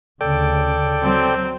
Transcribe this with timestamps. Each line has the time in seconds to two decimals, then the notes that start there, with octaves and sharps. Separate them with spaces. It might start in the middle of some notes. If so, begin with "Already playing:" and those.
0.21 D2 C#3 A4 D5 G5
1.03 F#3 C4